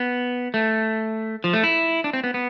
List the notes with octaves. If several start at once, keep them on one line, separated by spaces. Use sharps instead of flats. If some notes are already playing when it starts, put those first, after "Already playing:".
Already playing: B3
A3
F3
A3
E4
D4
C4
B3
B3